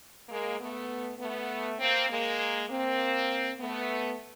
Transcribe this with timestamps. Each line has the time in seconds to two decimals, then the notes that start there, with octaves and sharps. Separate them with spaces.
0.29 G#3 A#3
0.58 A3 B3
1.19 A3 B3
1.79 A#3 C4
2.09 G#3 A#3
2.69 A#3 C4
3.58 A3 B3